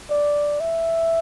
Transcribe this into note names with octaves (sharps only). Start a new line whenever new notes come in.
D5
E5